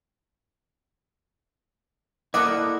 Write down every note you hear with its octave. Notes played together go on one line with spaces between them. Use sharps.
A#3 E4 A4 A#4 D5 D#5 F#5 D6